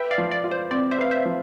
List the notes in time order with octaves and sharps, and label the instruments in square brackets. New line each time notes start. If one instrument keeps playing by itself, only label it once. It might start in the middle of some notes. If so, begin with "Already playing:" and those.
Already playing: [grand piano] B4 [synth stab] E5 G5
[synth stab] D5 F5
[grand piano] F3
[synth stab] D5
[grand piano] F4
[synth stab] C5
[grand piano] C4 [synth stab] D5
[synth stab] C5 E5
[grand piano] B4 [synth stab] F5
[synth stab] C5 E5
[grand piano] F3